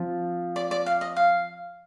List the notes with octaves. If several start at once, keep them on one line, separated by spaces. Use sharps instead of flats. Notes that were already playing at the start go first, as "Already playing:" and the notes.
Already playing: F3 C4 F4
D5
D5
F5
D#5
F5